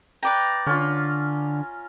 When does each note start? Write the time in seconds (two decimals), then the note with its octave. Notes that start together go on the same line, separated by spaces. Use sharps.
0.23 B4 D5 G5 A#5
0.67 D3 C#4 F4